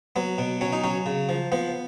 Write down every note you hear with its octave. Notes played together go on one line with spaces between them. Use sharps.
F#3 B3
B2
F#3 C#4
D#4
F#3 C#4
C#3
F3
F3 B3